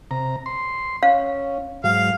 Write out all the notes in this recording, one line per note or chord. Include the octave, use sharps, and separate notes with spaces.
C3 A#5
C6
C#4 F5
G#2 F#3 F5